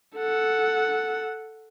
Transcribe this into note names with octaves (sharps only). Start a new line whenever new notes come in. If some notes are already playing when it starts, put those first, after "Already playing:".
A4 F#5